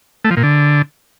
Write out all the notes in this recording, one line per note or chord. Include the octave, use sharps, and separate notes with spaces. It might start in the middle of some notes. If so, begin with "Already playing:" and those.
A3
F3
A#2
D3